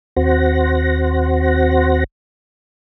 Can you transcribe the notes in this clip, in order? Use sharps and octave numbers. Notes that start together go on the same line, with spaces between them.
D#2 C4 F#4 C5 F#5 A#6